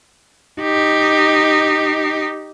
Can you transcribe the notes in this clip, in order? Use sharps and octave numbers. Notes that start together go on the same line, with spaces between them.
D#4 G4